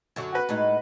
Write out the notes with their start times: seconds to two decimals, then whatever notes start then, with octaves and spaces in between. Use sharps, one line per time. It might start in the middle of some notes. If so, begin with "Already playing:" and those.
0.16 F#2 D3 F#3
0.33 F#4 B4
0.49 A2 G#3 D#4